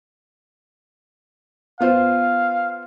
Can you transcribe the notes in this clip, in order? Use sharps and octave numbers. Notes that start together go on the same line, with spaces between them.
B3 F4 C5 F5